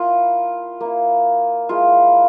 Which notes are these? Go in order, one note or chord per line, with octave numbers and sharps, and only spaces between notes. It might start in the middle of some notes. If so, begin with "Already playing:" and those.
Already playing: A#3 E4 F4
A#3 E4
G#3 E4 F4